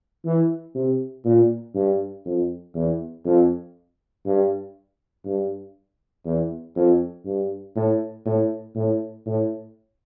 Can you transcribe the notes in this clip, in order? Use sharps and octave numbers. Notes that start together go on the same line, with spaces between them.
E3
C3
A#2
G2
F2
E2
F2
G2
G2
E2
F2
G2
A2
A2
A2
A2